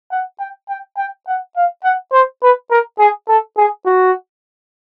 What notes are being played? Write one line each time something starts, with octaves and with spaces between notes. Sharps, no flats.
F#5
G5
G5
G5
F#5
F5
F#5
C5
B4
A#4
G#4
A4
G#4
F#4